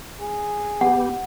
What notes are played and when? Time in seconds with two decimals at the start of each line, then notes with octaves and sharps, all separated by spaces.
0.20 G#4
0.81 B3 G4 F#5